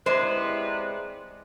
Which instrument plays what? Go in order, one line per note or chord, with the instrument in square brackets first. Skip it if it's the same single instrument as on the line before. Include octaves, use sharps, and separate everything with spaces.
[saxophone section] C3 B3 B4 [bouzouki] G#3 E4 D5 [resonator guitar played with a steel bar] C5